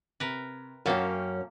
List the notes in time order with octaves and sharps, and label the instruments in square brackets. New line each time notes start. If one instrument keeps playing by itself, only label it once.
[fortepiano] C3 [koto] A#4 B4
[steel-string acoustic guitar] F#2 C#4 [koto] A#3 A4 E5 [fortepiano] A#4 F5 G5